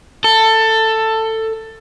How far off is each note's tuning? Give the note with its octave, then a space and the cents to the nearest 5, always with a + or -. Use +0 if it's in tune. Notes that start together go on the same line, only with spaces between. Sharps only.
A4 +15